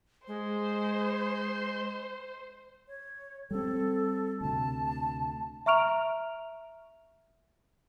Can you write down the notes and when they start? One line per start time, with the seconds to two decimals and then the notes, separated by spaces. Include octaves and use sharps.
0.28 G#3 C5
2.88 C#5
3.51 G3 C4 A4
4.41 D2 C3 A5
5.66 E5 A#5 C#6 F6 D7 F7